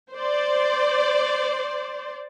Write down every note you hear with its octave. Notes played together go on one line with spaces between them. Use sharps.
C5 D5